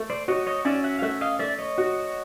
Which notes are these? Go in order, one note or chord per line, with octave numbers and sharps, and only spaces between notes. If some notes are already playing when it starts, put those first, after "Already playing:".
Already playing: A3
C5 D5
F#4 C#5 D#5
C#5 D#5
C#4 D5 E5
E5 F#5
F5
A3 E5 F#5
D#5 F5
A3 D5 E5
C#5 D#5
F#4